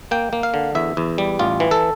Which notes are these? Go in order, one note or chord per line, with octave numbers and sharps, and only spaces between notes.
A#3 G5
A#3
F5
D3
E2 E5
E2
G3
A1 F4
E3
A4